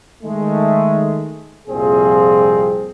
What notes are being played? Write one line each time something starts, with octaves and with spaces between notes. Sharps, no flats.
D#3 G#3 A3
C2 F2 A#2 F3 C4 G#4